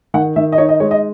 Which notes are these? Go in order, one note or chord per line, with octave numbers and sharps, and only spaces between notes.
D#3 F#5
D#3 E5
D#5
D#4 C#5
D#5
G#3 C#5
D#5